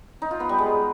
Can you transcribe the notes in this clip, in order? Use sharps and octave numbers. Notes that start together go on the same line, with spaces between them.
D#4
F4
B3
G3
G#3